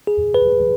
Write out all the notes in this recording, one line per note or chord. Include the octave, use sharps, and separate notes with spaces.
G#4
B4